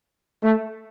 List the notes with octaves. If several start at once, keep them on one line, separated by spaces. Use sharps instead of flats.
A3